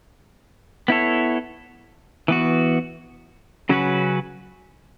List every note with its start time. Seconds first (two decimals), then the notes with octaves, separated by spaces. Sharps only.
0.88 B3 E4 A4 C#5
2.28 E3 B3 F#4
3.69 C#3 F#3 C#4 F#4 B4